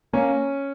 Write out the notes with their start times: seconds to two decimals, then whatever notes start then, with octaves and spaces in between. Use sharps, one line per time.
0.13 A#3 C#4